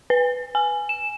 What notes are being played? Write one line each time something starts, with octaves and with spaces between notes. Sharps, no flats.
B4
G#5
E7